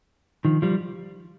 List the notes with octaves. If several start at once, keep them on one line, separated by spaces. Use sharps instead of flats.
D#3 F3
F3 G3